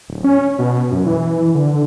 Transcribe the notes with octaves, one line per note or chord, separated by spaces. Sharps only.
D1
C#4
B2
F#2
E3
D3